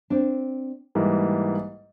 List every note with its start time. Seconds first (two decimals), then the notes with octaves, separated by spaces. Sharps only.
0.10 C4 D4
0.95 G#2 E3 G3 A#3